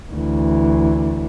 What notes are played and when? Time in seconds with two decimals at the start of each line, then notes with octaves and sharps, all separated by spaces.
0.12 D2 E3